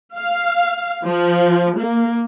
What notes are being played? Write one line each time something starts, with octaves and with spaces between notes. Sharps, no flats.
F5
F3
A#3